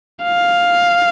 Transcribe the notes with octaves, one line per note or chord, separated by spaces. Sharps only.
F5